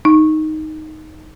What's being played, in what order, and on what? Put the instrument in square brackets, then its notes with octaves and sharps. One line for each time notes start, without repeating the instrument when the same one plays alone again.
[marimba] D#4